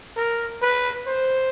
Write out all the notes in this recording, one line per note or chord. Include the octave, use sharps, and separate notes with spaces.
A#4
B4
C5